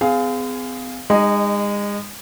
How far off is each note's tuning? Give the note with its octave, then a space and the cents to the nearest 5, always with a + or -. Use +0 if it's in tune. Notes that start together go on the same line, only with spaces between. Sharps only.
C4 -45 G#4 +0 F5 +0
G#3 -30 D#4 -25 D#5 +0